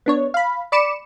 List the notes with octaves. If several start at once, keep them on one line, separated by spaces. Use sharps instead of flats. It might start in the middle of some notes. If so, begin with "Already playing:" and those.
B3 D4 C#5
F5 B5
D5 B5 D6 C#7 E7